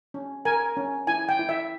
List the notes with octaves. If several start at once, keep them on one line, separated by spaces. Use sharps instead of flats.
C#4
A#4 G#5
C#4
E4 G#5
G5
E4
E5